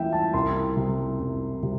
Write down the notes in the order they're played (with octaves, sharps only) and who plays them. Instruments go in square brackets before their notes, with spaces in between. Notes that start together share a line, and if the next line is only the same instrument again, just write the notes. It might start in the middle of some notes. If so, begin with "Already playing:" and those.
Already playing: [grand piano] E3 A#3 E5 G5
A5
C2 C6
C3
C2
C3